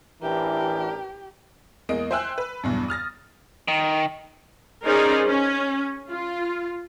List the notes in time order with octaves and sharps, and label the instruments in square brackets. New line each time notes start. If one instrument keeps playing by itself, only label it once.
[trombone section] A1 D4 A#4 [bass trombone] E3 [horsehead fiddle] G4
[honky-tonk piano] E2 G#3 A#3 D#5 D7
C5 E5 G5 G#5 E6 F#6
B4
B1 E2 G2
D#6 F6 A6 A#6
[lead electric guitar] D#3
[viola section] C#4 D#4 G#4 A#4 C5 D5
C#4
F4